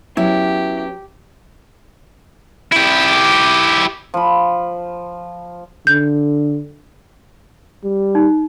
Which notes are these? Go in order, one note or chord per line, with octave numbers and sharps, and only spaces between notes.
F#3 B3 C#4 E4 G4
E4 G4
F3 B5
D3 G6
G3
D#4